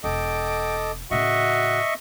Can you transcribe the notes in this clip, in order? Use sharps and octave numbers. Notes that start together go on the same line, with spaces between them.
E1 A4 D#5 G5 D6
A2 C#3 F#4 D#5 E5 C#6